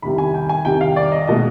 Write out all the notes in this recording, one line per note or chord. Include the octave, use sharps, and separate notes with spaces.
C2 C3 D#3 B5
G#5
G5
G#5
C2 C3 D#3 G5
F5
D5
D#5
B2 G#3 D#5